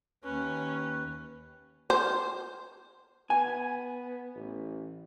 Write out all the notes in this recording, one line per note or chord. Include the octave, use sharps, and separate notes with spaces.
D#2 C#4 B4
C5
B3 G#5
A1